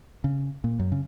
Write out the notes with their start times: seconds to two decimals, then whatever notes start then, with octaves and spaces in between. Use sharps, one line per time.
0.24 C#3
0.64 A#2
0.79 F#2
0.92 C#3